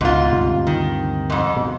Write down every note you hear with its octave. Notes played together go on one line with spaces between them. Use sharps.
C#2 G#2 B2 F4
D2 G2 C3
D#3
F2 G#2
B2